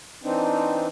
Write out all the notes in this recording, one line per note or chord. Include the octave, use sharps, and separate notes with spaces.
E3 C4 D4 D#4